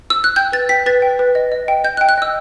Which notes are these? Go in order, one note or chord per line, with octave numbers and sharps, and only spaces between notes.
E6
F#6
G5 G6
B4 A6
G5 B6
B4 A6
G5
B4
D#5
D#5
G5
D#5 G6
F#6
G5
F#6
D#5 E6